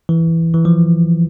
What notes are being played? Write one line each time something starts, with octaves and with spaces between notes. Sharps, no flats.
E3
E3
F3